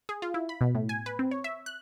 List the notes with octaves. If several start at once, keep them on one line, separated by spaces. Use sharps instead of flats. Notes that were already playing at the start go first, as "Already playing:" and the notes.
G#4
F4
E4
B5
B2
A2
G#5
B4
C4
C#5
E5
F#6